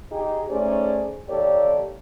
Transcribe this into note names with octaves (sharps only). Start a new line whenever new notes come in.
D#4 G4 G#4
A3 C#4 D#4 G#4 C5 D5
D#2 G4 A4 C#5 D5